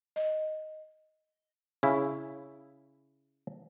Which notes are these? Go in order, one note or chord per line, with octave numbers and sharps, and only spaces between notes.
D#5
C#3 E4